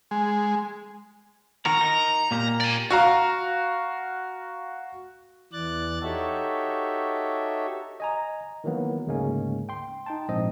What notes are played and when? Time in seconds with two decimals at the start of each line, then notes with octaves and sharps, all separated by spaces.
0.11 G#3
1.66 D#3 F#4 A#4 A#5
1.81 D#4 A#4
2.31 A#2 A#3 G4
2.60 D5 G#5
2.91 F#4 F5 A#5
5.53 E2 E3 D5 F#6 A6
6.02 D#4 F#4 G4 A4 C#5 E5
8.00 D#5 G#5 A#5
8.64 D#3 E3 F#3 A#3 B3
9.07 D2 G#2 C#3 G#3 A#3 C#4
9.69 G5 C6
10.06 D#4 G5 A5
10.29 A#1 G#2 C4 D#5